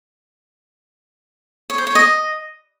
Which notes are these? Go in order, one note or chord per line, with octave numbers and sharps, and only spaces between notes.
C#5
C5
C#5
D#5